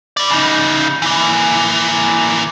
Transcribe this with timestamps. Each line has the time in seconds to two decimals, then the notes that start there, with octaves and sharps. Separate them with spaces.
0.17 B4 D5
0.30 C#3 D#4
1.02 E3 A#3